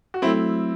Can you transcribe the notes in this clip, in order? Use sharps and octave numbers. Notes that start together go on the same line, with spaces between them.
F#4
F#3 A3 C4 E4